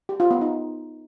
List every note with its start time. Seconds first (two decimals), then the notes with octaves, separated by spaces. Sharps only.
0.09 G4
0.20 F4
0.31 B3
0.41 D#4